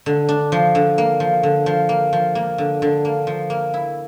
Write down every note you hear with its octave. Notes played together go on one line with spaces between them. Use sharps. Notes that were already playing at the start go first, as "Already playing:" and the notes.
D3
D4
F3
D3
A#3
F3
D3
F3
A#3
F3
A#3
D3
D3
A#3
F3
A#3
E4